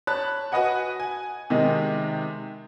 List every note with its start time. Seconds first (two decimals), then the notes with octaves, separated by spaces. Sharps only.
0.07 C#5 A5 B5 F#6
0.52 F#4 B4 D#5 F#5 G#5
1.00 G#5
1.50 C3 D#3 G#3 D#4